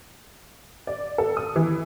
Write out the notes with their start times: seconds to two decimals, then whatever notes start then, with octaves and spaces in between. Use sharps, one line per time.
0.87 D5
1.18 A4
1.37 D#6
1.56 E3